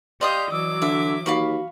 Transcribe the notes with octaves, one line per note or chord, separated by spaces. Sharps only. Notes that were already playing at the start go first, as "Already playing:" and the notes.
G4 D5 D#5 F5 C6 D#6 G6
E3 F#3 D6 E6
D3 E5
D#2 F#4 F5 B5 C#6